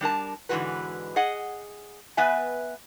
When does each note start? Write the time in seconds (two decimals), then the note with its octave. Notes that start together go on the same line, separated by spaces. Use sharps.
0.01 G3 D4 A#4 A5
0.49 G#2 D3 E3 G#3 F#4 B4
1.16 G#4 D#5 F#5
2.17 B3 B4 E5 G#5